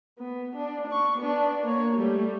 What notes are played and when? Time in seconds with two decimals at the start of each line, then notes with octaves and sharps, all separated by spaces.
0.19 B3
0.56 D4
0.87 D4 C#6
1.19 B3 D4
1.63 A#3 C#5
1.97 G3 A3